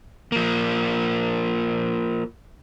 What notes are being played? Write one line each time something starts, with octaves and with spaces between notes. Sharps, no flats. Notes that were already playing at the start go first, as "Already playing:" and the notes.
F3 A#3